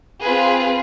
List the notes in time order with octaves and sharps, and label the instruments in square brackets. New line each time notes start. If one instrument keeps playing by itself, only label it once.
[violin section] C4 F4 G#4 B4